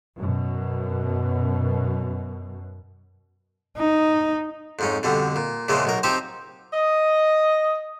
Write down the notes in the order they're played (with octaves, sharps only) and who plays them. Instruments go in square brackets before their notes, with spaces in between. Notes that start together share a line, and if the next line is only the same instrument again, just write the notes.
[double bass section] F#2 B2
[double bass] D#4
[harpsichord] F2 G#2 C#4
F2 B2 D3 G3
A#2
E2 A#2 C#3 E3 F3 G#3
B1 B2 A#4
F3 C4 D#4 G4 C5
[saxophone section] D#5